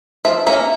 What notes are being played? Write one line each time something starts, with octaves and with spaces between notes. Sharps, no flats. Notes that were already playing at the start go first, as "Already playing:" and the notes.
F3 E5
A#3 C#4 E5